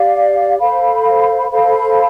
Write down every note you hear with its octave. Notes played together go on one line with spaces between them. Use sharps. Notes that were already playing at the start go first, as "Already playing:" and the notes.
Already playing: G4 D5 F5
A4 C5 F5 B5
A4 C5 F5 B5